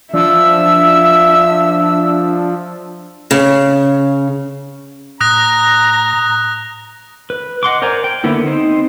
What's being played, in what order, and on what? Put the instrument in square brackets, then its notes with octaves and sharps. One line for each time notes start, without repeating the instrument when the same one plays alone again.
[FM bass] F3 [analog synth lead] D4 [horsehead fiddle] E5 [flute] E6
[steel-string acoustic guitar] C#3
[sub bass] A2 [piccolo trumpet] A#5 [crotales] D#6 F#6 A#6
[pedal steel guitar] B4
D#5 F#5 C6 D6
A#4 C5 D5 G#5 A#5
G5
D3 A#3 B3 E4
C4 D#4 C5